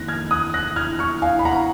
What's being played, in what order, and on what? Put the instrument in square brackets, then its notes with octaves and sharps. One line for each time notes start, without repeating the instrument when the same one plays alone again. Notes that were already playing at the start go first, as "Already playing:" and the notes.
Already playing: [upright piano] F2 D#3 A#3 F#6 A#6
F6 G#6
D#6 F#6
F#6 A#6
F6 G#6
C#6 F6
F5 G#5
B5
F#5 A#5